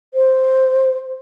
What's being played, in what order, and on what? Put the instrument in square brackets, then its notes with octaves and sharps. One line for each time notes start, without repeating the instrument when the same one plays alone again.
[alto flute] C5